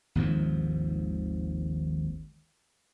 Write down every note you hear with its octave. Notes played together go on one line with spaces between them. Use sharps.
G#1 D#2 G#2 F3